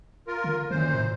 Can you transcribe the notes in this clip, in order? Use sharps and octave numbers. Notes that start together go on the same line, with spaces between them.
F4 A#4
D3
F#2 A#2 D#3 C5
A2